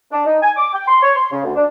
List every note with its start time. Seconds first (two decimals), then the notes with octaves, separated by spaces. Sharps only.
0.11 D4
0.26 D#4
0.41 G#5
0.57 D6
0.73 G5
0.87 C6
1.02 C#5
1.15 C6
1.32 C#3
1.44 D2
1.56 D4